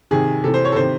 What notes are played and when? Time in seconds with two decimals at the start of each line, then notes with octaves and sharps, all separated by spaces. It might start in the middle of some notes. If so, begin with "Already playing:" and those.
0.11 C3 D#3 G#4
0.43 C3 E3 A4
0.54 C5
0.65 C#5
0.72 A4
0.76 C3 D#3 C5